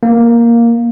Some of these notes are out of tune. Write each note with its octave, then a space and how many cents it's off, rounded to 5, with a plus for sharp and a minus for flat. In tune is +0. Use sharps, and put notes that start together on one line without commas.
A#3 +5